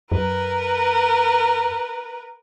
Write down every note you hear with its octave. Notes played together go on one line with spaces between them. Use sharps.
F#2 A#4 B4